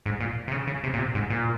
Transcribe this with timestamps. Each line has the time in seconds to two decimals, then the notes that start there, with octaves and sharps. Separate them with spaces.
0.06 G#2
0.20 A#2
0.48 C3
0.52 C#3
0.67 C#3
0.83 C3
0.94 A#2
0.99 C3
1.15 G#2
1.30 A#2